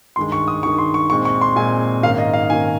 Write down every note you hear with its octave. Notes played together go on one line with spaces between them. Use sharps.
G2 D#3 G#3 C6
C#6
D#6
G2 D#3 G#3 C#6
C6
C#6
A#2 G#3 C4 C#6
C#6
C6
A#2 G#3 C4 G#5
G#2 D#3 A#3 C#4 F5
D#5
F5
G#2 D#3 A#3 C#4 G#5